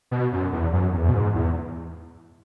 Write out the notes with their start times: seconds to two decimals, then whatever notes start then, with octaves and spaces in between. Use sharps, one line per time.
0.11 B2
0.33 F#2
0.53 E2
0.73 F#2
0.93 E2
1.09 B2
1.14 G#2
1.35 E2